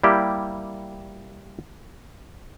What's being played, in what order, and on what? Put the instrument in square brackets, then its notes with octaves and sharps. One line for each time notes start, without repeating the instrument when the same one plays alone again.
[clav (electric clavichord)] G3 A#3 E4 G4